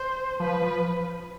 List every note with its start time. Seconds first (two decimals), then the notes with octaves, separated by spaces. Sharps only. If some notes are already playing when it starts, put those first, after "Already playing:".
Already playing: C5
0.40 F3 B4
0.62 F3